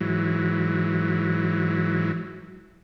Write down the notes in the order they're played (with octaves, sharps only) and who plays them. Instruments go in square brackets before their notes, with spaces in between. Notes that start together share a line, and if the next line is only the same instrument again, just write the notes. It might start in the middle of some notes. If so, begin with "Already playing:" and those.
[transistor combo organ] G#2 E3 F#3